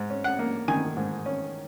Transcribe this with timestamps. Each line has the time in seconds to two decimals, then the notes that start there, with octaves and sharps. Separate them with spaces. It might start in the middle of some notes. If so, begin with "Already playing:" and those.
Already playing: G#2
0.10 C#4
0.24 F#5
0.39 A#3
0.68 D#3 G#5
0.97 G#2
1.26 C#4